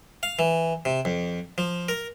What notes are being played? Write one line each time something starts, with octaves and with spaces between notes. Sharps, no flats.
F5
E3
C3
F2
F3
A#4